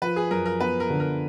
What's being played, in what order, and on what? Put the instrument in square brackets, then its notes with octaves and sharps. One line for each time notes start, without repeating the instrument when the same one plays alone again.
[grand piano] F3 [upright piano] B4
[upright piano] G#4
[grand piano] F#2 [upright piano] A#4
[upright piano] A#4
[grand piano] B3 [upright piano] B4
[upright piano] A#4
[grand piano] D3
[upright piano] A#4